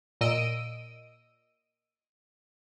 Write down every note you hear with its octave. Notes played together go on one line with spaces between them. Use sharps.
A#2 D#5 E6 D7 D#7